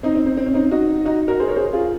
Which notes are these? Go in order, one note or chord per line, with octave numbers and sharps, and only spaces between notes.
C4 D#4
C4
C4
C4
C#4
C4 D#4
D#4 F#4
D#4 F#4
F#4 A#4
G#4 C5
A#4 C#5
G#4 C5
F4 G#4